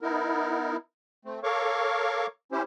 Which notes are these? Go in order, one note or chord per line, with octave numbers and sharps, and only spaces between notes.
B3 D#4 E4 A#4
A3 C4
A4 A#4 C#5 F5 C#6 D6
C#4 E4 G4 C5